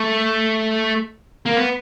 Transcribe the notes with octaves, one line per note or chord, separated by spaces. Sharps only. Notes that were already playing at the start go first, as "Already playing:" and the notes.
Already playing: A3
A#3
B3